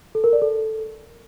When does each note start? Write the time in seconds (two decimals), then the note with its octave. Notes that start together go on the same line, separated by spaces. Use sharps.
0.15 A4
0.24 A#4
0.33 D5
0.42 A4